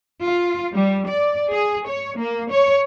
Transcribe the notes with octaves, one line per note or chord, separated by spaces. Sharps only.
F4
G3
D5
G#4
C#5
A#3
C#5